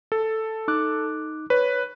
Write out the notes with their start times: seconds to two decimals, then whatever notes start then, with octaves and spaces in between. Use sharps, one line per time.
0.12 A4
0.68 D#4 D6 F#6
1.50 B4 C#5